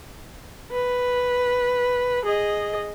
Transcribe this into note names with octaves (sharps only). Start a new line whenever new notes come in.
B4
G#4 D#5